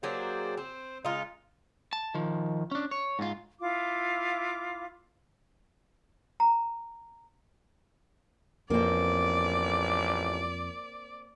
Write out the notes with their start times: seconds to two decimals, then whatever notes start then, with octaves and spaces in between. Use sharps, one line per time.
0.03 F#3 A#3 G4 G#4 C5 D5
0.57 C4 C5
1.05 C#3 G#3 D#4 F4
1.93 A5
2.15 D#3 F3
2.71 C#4 D4
2.91 C#5
3.19 G#2 F4
3.61 E4 F4 F5 D6
6.40 A#5
8.70 A1 F2 A#3 C4 D5